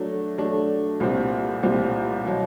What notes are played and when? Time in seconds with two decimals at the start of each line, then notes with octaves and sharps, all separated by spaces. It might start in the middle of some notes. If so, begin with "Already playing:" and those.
Already playing: F#3 A3 D4
0.38 F#3 A3 D4
1.00 C2 A#2 G3 C4
1.63 C2 A#2 G3 C4
2.26 B2 F#3